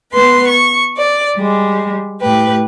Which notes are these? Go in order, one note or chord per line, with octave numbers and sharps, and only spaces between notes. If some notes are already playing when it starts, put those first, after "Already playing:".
B3 B4 C6
C#6
D5
G3 G#3
A2 G4 B4